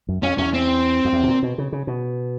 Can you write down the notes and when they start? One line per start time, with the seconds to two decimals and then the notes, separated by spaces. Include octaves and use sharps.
0.09 F#2
0.23 F2 C#4
0.38 E2 C#4
0.54 C4
1.05 F2
1.13 E2
1.23 B2
1.28 A#2
1.43 B2
1.58 C#3
1.72 C#3
1.87 B2